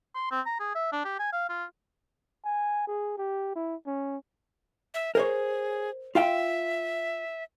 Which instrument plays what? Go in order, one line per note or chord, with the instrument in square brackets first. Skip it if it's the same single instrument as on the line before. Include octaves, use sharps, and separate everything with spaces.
[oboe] C6
C4
A#5
G#4
E5
D4
G4
G#5
F5
F4
[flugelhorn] G#5
G#4
G4
E4
C#4
[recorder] E5
[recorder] G#4 [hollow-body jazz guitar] A#4 C5 C#5
[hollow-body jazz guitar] F4 F5 G5 [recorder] E5